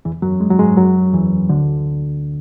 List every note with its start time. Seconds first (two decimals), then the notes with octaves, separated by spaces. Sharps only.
0.05 E2 E3
0.22 F#2 F#3
0.40 G#3
0.51 F#3
0.59 G#2 G#3
0.77 F#2 F#3
1.13 E2 E3
1.49 D2 D3